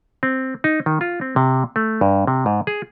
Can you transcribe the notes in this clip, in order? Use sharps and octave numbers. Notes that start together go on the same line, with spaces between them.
C4
D#4
D#3
F4
C4
C3
A3
G2
C3
G#2
G#4